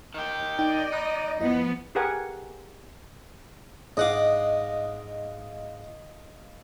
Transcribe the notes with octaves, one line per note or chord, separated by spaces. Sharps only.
D#3 G4
D#4 D5 D#5 G5
D#4 B5 D#6 F#6
F2 F3 B3 E4 D#5
G4 G#4 A#4 B4 F#5 G#5
G#2 D#5 F5 F#5 D6